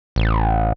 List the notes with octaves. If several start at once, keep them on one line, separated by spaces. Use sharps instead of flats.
A1